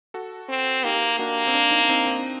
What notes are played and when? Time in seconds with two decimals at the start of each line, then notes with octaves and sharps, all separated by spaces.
0.14 F#4 A4
0.49 C4
0.84 A#3 D#4 G4
1.19 A#3 D4 F#4
1.47 C4
1.54 D4
1.71 C4 D#4
1.81 D4
1.89 C4 D#4
2.06 C4 D#4